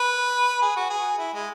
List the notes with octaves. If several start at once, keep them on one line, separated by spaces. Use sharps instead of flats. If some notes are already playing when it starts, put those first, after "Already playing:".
Already playing: B4
G#4
F#4
G#4
E4
G#3